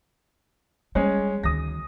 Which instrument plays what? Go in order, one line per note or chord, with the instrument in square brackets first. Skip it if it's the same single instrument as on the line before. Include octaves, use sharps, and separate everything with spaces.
[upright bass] G3 [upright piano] G#3 C#4
[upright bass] D2 D#3 [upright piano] D#6 A#6